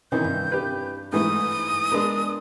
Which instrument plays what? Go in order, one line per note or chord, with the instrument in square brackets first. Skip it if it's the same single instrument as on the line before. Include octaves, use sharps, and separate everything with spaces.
[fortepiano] C3 D#3 E3 [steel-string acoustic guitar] C#4 [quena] G6
[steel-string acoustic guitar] G2
[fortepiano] G4 B4
[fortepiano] G#2 E3 A3 [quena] D#6
[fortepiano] G#3 B3 [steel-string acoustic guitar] D4 A#4